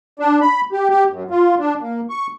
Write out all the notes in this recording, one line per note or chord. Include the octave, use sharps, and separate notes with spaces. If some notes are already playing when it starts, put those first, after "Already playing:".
D4
B5
G4
G4
F#2
F4
D4
A#3
C#6